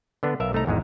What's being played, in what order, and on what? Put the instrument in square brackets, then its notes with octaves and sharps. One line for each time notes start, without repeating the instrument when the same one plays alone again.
[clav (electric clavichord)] D3 B3 D4
B1 A#4 E5 F5 A#5
C2 A3 D#4 A#5
G#1 E2 G#2 G#3